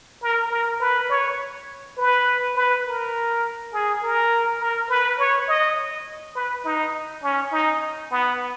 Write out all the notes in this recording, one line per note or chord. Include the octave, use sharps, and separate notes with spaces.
A#4
A#4
B4
C#5
B4
B4
A#4
G#4
A#4
A#4
B4
C#5
D#5
B4
D#4
C#4
D#4
B3